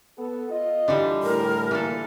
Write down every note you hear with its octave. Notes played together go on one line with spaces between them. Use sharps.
B3 A4
F4 D#5
D3 E3 G3
A2 A#4
A#2 E3 A4